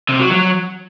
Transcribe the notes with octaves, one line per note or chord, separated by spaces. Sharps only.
C3
F#3
F#3